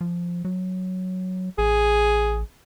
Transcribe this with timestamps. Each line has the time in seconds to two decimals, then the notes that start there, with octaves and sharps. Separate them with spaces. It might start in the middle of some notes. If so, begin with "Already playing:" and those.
0.01 F3
0.45 F#3
1.58 A1 G#4